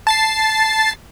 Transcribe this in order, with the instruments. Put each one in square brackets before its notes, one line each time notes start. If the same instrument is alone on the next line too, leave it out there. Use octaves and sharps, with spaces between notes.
[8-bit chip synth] A5 A6 C7